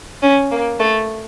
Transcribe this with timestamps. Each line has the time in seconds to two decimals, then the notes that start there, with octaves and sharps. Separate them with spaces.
0.22 C#4
0.51 A#3
0.80 A3